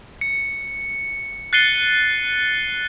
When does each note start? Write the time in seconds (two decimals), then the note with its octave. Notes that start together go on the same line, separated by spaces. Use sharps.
0.21 C#7
1.53 F#6 A6 C7 C#7 D#7 G7